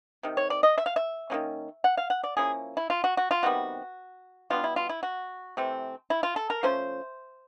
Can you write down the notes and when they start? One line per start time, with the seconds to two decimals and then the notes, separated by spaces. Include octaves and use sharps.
0.23 C3 D#3
0.37 C#5
0.50 D5
0.63 D#5
0.78 E5
0.86 F5
0.96 E5
1.30 D#3 F#3 A#3 C#4
1.84 F#5
1.97 F5
2.10 F#5
2.23 D5
2.37 F3 A#3 C#4 E4 G#4
2.77 E4
2.90 F4
3.04 F#4
3.17 F#4
3.31 F4
3.43 C3 D#3 G3 B3 F#4
4.50 B2 G3 B3 D4 F4
4.64 E4
4.76 F4
4.89 E4
5.03 F#4
5.57 C3 E3 A3 C4
6.10 E4
6.23 F4
6.36 A4
6.50 A#4
6.63 F3 A3 C#4 C5